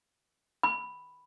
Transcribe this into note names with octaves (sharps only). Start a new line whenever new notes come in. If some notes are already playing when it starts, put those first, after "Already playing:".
B5